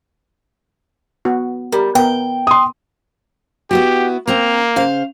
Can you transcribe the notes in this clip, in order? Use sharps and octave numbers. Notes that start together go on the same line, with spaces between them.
B3 F#4
G3 A#4
B3 A#4 G5
C6 D#6
B3 E4 F#4 G4
A#3 C4 C5 A#5
C#3 C5 F5